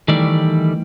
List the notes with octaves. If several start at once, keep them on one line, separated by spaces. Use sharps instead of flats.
D#3 E3 G3 A3 D5